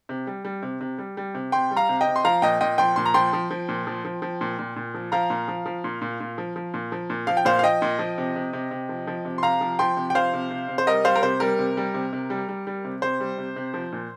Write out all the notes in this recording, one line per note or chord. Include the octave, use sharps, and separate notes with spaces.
C3
G3
G3
C3
C3
G3
G3
C3
C3 G5 C6
G3
F5 A#5
C3
D#5 G5
C3
C6
F3 F5 A#5
A#2 D#5 G5
A#2 D#5 G5
F3 G5 C6
A#2 C6
A#5
F3 G5 C6
F3
F3
A#2
F3
F3
F3
A#2
A#2
A#2
F3
F3 F5 A#5
A#2
F3
F3
A#2
A#2
A#2
F3
F3
A#2
F3
A#2
F3 F5
G5
A#2 C5 F5
F5
F3 D#5 G5
A#2
F3
C3
C3
C3
C3
F3
F3
C3
C6
C3 F5 A#5
F3
F3 G5 C6
C3
G5
F3 C5 F5
C3
C3
C3
C5
G3 A#4 D#5
G3 C5 F5
A#4
C3 C5
G3 A#4
C3
G3
C3
C3
G3
G3
G3
C3
C3 C5
G3
C3
C3
F3
A#2